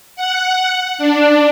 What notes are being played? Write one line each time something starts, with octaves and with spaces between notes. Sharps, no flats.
F#5
D4